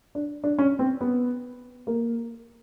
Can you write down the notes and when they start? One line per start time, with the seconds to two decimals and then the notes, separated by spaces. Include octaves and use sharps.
0.15 D4
0.44 D4
0.59 C#4
0.79 C4
1.01 B3
1.87 A#3